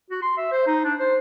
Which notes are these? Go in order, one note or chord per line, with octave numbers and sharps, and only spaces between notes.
F#4
C6
E5
C5
D#4
D4
C5